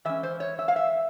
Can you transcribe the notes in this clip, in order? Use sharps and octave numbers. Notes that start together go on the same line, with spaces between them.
E3 G#3 C#4 E5
C5
C#5
E5
F5
E5